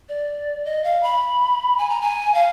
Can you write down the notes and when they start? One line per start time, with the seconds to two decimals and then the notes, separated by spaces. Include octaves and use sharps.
0.09 D5
0.65 D#5
0.84 F5
1.03 B5
1.78 G#5
1.90 A#5
2.02 G#5
2.34 F5